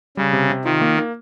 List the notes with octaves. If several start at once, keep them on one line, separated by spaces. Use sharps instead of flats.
C#3 G3
C3
C3
D#3 F4
A#3
A#3